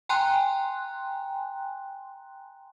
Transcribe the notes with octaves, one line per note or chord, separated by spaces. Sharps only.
G5 G#5 A#5 C6 F#6